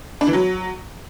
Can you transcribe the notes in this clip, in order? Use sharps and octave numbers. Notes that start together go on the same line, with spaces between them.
D4
E3
F#3